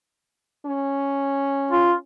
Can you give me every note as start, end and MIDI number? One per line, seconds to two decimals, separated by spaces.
0.66 2.01 61
1.71 1.94 65